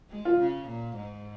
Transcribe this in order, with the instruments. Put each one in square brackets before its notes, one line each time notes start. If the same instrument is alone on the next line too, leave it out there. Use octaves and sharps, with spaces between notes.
[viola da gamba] G#3
[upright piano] F4
[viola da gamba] C#3
A#2
G#2